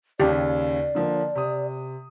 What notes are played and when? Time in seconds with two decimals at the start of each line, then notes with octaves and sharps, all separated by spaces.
0.20 D#2 C#3 G4 D5
0.95 D3 F3 A#3
1.35 C3 D#6